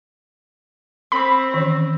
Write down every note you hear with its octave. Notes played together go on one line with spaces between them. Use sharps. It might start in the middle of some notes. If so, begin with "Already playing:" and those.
C4 B5
D#3 E3 C#4